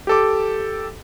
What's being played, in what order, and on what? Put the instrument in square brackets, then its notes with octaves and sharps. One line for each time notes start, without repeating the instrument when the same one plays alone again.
[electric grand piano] G4 A4 D6